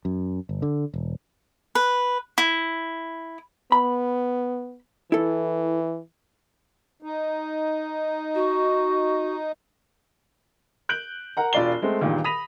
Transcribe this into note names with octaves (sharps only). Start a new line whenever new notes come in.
F#2
G1
D3
E1
B4
E4
B3 B5
E3 E4 A4
D#4
F#4
F#6 G6 D7 F#7
A#4 F#5 A#5
E1 F4 D5 C7 G7
G#3 A3 C4
E2 G2 A#2 D#3
B5 D#6 A#6 B6 D#7 F7